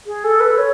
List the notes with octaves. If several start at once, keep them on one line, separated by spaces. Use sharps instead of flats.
G#4
A4
B4
C#5